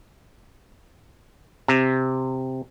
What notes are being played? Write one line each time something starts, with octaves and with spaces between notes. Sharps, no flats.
C3